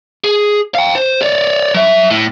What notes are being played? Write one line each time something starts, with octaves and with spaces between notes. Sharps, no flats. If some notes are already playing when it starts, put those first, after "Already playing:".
G#4
F5 G5
C5
C#5 D5
F#3 E5
A2